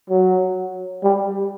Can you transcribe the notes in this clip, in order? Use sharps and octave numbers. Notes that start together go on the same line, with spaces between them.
F#3
G3